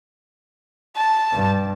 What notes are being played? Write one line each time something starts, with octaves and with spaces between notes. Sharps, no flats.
A5
G2